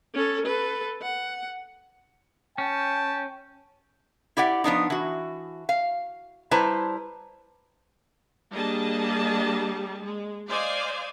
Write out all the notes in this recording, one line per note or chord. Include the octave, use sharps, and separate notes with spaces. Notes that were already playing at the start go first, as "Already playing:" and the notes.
C#4 A4
A4 B4
F#5
C#4 G5 A5
E4 G4 D5 F#5
F3 B3 D4 D#4
E3 F#4
F5
G3 E4 B4 C5 A5 A#5
G3 A#3 D4 G#4 D#5 A5
G#3
C5 D5 D#5 F5 G#5